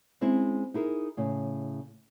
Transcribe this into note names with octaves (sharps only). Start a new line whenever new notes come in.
G#3 C4 C#4 E4
D#4 E4 G#4 A#4
A2 C#3